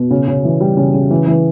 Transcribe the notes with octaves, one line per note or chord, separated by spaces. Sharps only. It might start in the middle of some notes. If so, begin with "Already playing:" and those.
Already playing: B2
C#3
C#3
E3
G3
C#3
C#3
E3
E3